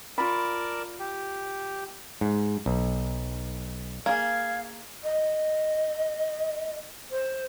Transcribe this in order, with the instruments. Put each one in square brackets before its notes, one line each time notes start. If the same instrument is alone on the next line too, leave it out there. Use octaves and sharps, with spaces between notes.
[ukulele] F4 B5 [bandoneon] A#4 D5 A5
[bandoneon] G4
[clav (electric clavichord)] G#2
B1
[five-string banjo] A#3 G#4 [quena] F5 [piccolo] G#6
[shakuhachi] D#5
C5